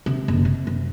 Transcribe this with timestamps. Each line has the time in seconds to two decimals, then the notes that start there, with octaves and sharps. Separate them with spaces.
0.06 C3
0.28 F#1
0.45 C3
0.67 F#2